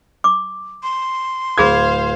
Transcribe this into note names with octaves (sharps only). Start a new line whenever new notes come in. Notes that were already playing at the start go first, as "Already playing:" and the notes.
D6
C6
D1 G#4 C5 F5 B5 D#6 G#6